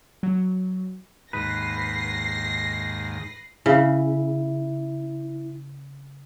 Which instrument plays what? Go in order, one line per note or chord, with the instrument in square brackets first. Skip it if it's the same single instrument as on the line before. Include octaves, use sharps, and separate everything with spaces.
[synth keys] F#3
[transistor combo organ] D#2 G#2 [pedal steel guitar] B4 [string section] A#6 C7
[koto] C#3 [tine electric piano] E4